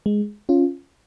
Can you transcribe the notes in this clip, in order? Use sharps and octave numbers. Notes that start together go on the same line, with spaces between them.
G#3
C#4 F4